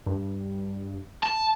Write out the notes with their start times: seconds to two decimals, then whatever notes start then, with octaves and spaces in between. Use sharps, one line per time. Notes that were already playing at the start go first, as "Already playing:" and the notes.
0.06 G2
1.23 A5